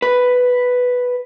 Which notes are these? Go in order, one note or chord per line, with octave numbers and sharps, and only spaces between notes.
B4